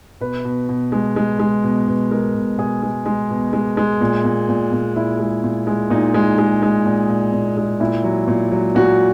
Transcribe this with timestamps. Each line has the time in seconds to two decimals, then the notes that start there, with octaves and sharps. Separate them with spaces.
0.21 B2 B4
0.45 B2
0.69 B2
0.92 G#3
1.16 G#3
1.39 G#3
1.64 B2
1.88 B2
2.11 G#3 A#4
2.35 B2
2.58 B2 G#4
2.82 G#3
3.06 G#3
3.30 B2
3.53 G#3
3.77 G#3
4.01 A#2
4.24 A#2
4.49 A#2
4.72 A#2
4.95 A#2 E4
5.20 G#3
5.43 A#2
5.67 G#3
5.90 A#2 D#4
6.14 G#3
6.38 G#3
6.62 G#3
6.86 A#2
7.09 A#2
7.33 A#2
7.57 G#3
7.80 A#2 E4
8.04 F#3
8.27 A#2
8.51 F#3
8.75 A#2 F#4